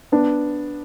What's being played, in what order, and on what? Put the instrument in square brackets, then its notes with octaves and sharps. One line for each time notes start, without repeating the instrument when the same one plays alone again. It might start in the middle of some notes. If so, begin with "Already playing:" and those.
[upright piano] B3 D4